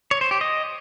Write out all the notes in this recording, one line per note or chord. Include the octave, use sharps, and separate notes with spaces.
C#5
C5
G4
D#5